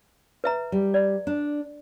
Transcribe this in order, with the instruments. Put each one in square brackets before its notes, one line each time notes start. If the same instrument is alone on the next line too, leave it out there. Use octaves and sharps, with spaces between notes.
[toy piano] B4 E5 A#5
[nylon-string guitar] G3
[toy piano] D5
[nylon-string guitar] D4